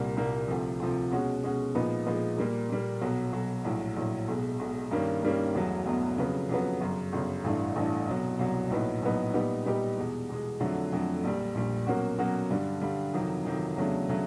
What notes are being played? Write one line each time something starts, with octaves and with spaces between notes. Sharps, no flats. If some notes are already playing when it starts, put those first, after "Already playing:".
Already playing: C2 A#2 G3 A#3
C2 A#2 G3 A#3
D2 C3 F3
D2 C3 F3
B2 G#3 C#4 F#4
B2 G#3 C#4 F#4
A#2 F3 G#3 B3 D#4
A#2 F3 G#3 B3 D#4
A#2 G3 A#3
A#2 G3 A#3
B1 B2 F#3
B1 B2 F#3
A#1 A2 F#3
A#1 A2 F#3
B1 B2 G#3
B1 B2 G#3
G2 D#3 G3 A#3 C#4
G2 D#3 G3 A#3 C#4
E1 E2 B2 F#3 A3
E1 E2 B2 F#3 A3
F2 C#3 F#3 B3
F2 C#3 F#3 B3
G1 F#2 C#3
G1 F#2 C#3
A1 G2 E3 A3 D4
A1 G2 E3 A3 D4
C2 B2 F#3
C2 B2 F#3
A#1 A2 F#3 B3 D#4
A#1 A2 F#3 B3 D#4
A#2 G3 B3 D#4 G4
A#2 G3 B3 D#4 G4
E2 B2 G#3
E2 B2 G#3
F2 D3 F#3 A3
F2 D3 F#3 A3
A#1 A#2 G3
A#1 A#2 G3
B2 F#3 A#3 C#4 F#4
B2 F#3 A#3 C#4 F#4
G2 D3 G3
G2 D3 G3
F2 C3 D#3 F#3
F2 C3 D#3 F#3
E2 C#3 F#3 A3 D4
C#3 F#3 A3 D4